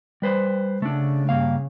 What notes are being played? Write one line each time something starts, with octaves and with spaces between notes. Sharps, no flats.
G3 B4 C5
C#3 A3 D4
G2 A#3 F5